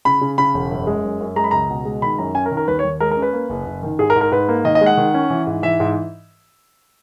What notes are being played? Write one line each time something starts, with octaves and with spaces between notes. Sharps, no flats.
C#3 B5
C#3
C#3 B5
E1
F#2
G#3
F#2
F#2
G#3 A#5
B5
C#2 A#5
B2
G#3
D#3 B5
F#2 A#5
C#4 G#5
A#4
D#3
A#4
D#2 B4
C#5
D#2
G#3 A#4
A#4
C#4
B4
A#3
F#1
F#1
D#3
G#2 G#4
A#4
G#2
A#4
G#2 B4
A#3
D#3 D#5
D#5
G#3
F#5
D#3
C#4
E3
G#2
E3 E5
G#2